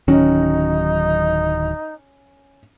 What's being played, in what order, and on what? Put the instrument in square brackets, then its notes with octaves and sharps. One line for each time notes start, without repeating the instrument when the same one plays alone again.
[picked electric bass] D1 D#3 F#3 [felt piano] C#4 [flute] D#4